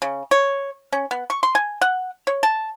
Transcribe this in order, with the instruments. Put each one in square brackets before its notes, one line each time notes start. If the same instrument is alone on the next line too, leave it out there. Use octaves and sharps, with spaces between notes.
[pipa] C#3
C#5
C#4
B3
C#6
C6
G#5
F#5
C#5
A5